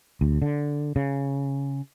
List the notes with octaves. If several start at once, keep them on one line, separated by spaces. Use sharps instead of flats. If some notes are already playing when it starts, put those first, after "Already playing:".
D2
D3
C#3